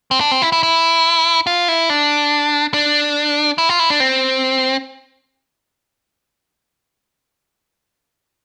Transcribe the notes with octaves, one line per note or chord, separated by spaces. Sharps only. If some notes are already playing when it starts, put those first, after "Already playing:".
C4
D4
C4
E4
E4
E4
F4
E4
D4
D4
E4
F4
E4
D4
C4